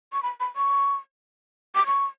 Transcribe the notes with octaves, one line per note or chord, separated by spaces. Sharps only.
C#6
B5
B5
C#6
D6
C#6